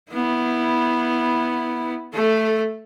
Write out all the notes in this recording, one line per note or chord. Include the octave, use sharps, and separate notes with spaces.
B3 E4
A3 A4